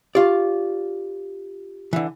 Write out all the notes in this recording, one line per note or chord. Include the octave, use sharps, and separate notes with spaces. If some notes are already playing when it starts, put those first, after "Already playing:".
F4 G4 D5
D3 E3